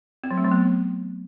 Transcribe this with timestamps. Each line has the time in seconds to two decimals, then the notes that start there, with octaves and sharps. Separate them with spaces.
0.24 C4
0.31 F#3
0.38 A3
0.45 F#3
0.51 B3